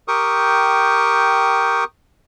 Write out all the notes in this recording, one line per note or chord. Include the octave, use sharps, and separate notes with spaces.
G4 A#4 G5 C#6 D#6